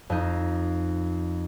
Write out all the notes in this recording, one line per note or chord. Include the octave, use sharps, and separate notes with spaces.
F2 D#4